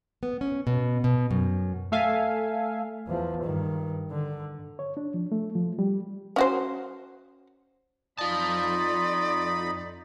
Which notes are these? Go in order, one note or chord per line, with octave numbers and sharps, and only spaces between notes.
B3
C#4
B2
B2
F#2
A3 A4 E5 F5 G#5
E2 F3
G2 D#3
D3
C#5
D4
F3
A3
F3
G3
C#4 F#4 C5
F2 D#4 F4 D5 D#5 A5 B5